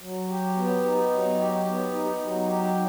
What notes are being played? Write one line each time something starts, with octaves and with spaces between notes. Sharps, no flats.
F#3
G4
B3
D#4
F#3
G4
B3
D#4
F#3
G4